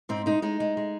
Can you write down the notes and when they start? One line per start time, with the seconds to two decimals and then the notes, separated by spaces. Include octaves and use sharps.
0.09 G#2 C4
0.26 G#3 D#4
0.42 G#3 D#4
0.60 G#3
0.77 G#3